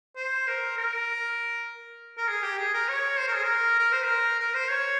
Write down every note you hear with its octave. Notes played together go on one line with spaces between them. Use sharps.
C5
A#4
A#4
A#4
G#4
G4
G#4
A#4
C#5
C5
A#4
G#4
A#4
A#4
C5
A#4
A#4
C5
C#5